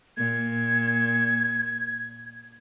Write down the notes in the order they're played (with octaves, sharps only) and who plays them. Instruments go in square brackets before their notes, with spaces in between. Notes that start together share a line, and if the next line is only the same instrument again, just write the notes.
[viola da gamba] A#2 [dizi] G#6